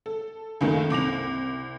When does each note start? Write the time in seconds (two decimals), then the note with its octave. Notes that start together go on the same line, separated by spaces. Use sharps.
0.06 A4
0.61 C#2 F#2 D#3 A3 A#3
0.90 C2 D6 A#6 F7